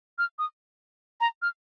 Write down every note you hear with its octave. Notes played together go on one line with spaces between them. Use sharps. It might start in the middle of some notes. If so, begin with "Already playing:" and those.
F6
D#6
A#5
F6